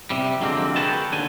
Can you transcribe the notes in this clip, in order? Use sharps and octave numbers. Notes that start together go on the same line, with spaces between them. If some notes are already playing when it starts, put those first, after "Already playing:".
C3 G3
F2 D3 F#3 G#3 A#3 C4
G#4 A#4 B4 C#5 G5 A5
D#2 D3 G#5